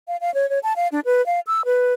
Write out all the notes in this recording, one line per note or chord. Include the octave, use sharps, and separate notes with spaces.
F5
F5
C#5
C#5
A5
F5
D4
B4
F5
E6
B4